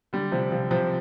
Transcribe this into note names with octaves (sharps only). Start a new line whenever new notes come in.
D3 G3
C3 F3
C3 F3
C3 F3